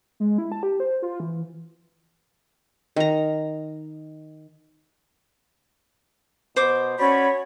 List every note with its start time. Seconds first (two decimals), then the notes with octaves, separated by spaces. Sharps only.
0.20 G#3
0.38 E4
0.52 A5
0.63 G4
0.80 C5
1.02 F4
1.20 E3
2.96 D#3 A#5
6.56 B2 C5 D6
6.99 C#4 F#4 C#5 D5 B5